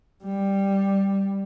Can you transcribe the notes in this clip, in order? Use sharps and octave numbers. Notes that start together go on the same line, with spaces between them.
G3